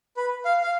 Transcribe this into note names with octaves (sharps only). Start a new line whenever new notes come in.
B4
F5
F5